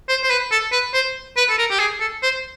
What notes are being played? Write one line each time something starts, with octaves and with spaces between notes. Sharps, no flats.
C5
C5
B4
A4
B4
C5
B4
A4
A#4
G4
G#4
A4
C5